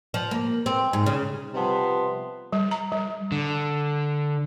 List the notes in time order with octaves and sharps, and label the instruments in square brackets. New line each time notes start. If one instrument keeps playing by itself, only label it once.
[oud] F3
A#3
C4
G#2
C#3
[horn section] C3 F3 G3 B3 A5 C6
[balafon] G3
A#5
G3
[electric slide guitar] D3